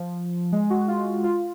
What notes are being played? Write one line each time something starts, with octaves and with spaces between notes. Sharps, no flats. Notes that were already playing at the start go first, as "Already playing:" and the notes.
Already playing: F3
G#3
F#4
F4
F4